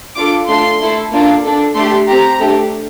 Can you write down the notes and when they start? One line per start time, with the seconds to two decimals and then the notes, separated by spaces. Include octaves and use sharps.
0.17 D4 F4 A4 D6
0.49 A3 D4 F4 C6
0.80 A3 E4 A4
1.12 A#3 D4 F4 A4
1.44 D4 A4
1.75 A3 D4 G4 C6
2.08 C4 G4 A#5
2.40 A3 D4 G4